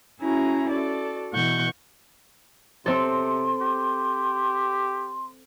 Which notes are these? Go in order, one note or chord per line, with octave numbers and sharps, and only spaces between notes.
C#4 E4 F#4 G#4 A#5
F#4 A4 D5
B2 E3 F#5 C#6 G6
C3 C4 A4 C6
G4